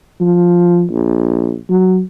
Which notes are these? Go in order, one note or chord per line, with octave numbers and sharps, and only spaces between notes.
F3
A#1
F#3